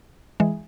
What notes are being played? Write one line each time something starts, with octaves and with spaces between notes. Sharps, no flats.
E3 G#3